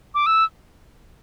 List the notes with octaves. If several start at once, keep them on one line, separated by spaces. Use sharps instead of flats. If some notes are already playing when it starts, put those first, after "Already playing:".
D6
E6